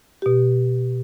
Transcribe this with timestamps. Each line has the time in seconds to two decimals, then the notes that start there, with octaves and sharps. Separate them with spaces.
0.22 B2 G4